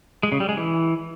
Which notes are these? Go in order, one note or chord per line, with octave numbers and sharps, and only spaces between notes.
G#3
C#3
G3
G#3
E3